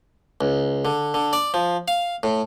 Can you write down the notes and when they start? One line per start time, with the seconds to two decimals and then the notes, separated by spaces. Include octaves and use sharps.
0.41 C#2
0.85 D3
1.14 D3
1.33 D5
1.54 F3
1.88 F5
2.23 A2